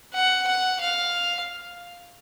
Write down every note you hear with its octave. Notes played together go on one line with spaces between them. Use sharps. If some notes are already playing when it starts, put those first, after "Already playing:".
F#5
F#5
F5